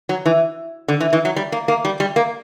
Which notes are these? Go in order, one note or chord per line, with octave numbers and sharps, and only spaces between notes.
F#3
E3
D3
E3
E3
F#3
G3
A#3
A#3
G3
G3
A#3